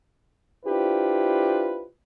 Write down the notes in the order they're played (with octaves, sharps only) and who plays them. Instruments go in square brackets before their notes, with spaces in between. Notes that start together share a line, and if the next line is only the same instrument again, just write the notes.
[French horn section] D4 E4 F4 G4 B4 C5